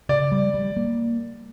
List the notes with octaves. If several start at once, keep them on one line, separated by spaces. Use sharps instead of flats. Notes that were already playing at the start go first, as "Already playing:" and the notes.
C#3 D5
G3
G3
A#3